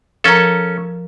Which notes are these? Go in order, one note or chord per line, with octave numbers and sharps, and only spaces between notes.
F3 C#4 A4 A#4 A#5